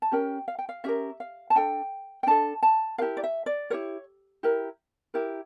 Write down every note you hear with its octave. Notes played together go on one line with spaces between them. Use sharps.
A5
C#4 G4 A#4 G5
F5
G5
F5
C#4 G4 A#4 E5
F5
A5
D4 A4 G5
G5
D4 A4 A5
A5
E4 G4 A#4 F5
D5
E5
D5
E4 G4 A#4 C#5
E4 G4 A#4
E4 G4 A#4